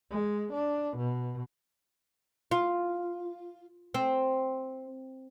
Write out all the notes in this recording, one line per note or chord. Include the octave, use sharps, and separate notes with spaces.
G#3
D4
B2
F4
C4